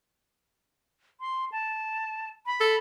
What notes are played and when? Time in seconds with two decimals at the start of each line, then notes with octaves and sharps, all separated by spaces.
1.20 C6
1.52 A5
2.46 B5
2.60 A4